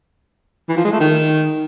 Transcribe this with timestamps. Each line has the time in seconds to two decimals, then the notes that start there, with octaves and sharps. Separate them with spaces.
0.69 E3
0.77 F3
0.85 G#3
0.92 A3
1.00 D#3